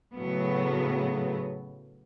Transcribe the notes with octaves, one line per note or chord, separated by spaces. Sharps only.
A2 C#3 F#3 B3